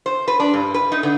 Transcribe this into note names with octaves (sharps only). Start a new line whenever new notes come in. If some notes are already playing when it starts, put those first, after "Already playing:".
C5
B4
D4
G2
B4
D#4
D3